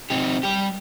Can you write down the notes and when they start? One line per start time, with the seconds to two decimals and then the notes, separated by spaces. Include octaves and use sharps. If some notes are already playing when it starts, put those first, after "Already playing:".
0.10 C4 D#4 G4
0.43 G3 G4